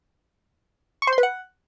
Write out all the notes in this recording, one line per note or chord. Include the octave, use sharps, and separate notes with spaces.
C#6
C5
C6
B4
F#5